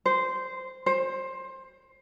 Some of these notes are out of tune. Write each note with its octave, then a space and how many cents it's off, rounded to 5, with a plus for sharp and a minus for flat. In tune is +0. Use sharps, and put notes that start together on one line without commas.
C5 -10
C5 +20